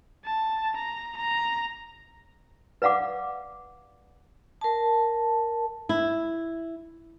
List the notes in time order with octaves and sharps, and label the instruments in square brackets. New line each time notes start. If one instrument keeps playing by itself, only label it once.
[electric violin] A5
A#5
A#5
[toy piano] B4 D5 F5 F#5 D6
[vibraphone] A#4 A5
[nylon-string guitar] E4